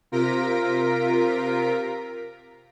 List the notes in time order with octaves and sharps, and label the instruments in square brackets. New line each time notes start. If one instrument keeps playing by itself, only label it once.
[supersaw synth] C3 F4 A#4 A#6 B6 D7